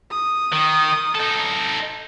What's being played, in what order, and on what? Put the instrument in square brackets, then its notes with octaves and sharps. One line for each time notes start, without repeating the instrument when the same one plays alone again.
[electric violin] D#6
[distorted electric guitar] D#3
D#4 A4